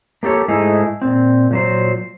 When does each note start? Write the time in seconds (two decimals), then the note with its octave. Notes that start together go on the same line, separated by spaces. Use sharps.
0.23 A#3 G4 A4 C#5
0.48 G#2 A3 D#4 E4 G#4
1.02 A#2 C4
1.51 A#2 F#3 C5